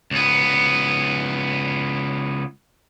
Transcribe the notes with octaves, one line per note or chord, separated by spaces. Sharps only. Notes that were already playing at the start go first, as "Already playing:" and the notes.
C#2 B3